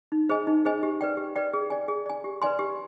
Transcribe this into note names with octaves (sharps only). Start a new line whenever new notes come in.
D#4
G#4 C5 D#5 G#5
D#4
G#4 C5 D#5 G#5
G4
B4 D5 G5
G4
B4 D5 G5
G#4
D5 G#5
G#4
D5 G#5
G4
B4 D5 G#5 C6
G4